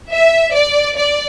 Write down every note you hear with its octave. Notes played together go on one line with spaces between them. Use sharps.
E5
D5
D5